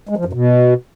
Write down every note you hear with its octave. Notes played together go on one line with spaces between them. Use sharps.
G#3
F3
F#2
B2